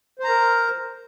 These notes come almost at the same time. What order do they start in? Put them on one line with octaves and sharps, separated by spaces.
C5 A#5 A#4